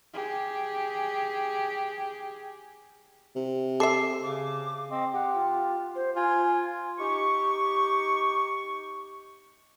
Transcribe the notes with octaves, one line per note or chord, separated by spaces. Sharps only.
G4 G#4
C3
A4 E5 D6 C7
C#3 D6
C4 D#5
G4 F#5
F4
C5
F4 G#5
D#4 G4 C#6